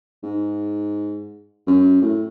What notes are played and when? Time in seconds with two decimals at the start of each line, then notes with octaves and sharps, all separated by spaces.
0.23 G#2
1.67 F#2
2.02 A2